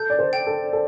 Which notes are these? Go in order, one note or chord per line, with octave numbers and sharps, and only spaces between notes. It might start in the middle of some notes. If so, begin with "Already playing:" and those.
Already playing: A4 G6
D5
C5
G5
A4
A4